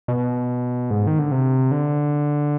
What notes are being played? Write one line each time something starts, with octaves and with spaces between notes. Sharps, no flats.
B2
G#2
D#3
D3
C3
D3